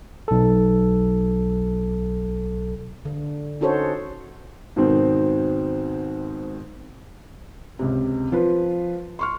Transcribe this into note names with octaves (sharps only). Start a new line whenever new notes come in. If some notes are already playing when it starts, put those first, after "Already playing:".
B1 A4
D3
C#4 D#4 F#4 A4 C5 C#5
G#2 B2 D#3 C4
C#2 C3
F3 F4 B4
C6 C#6 F6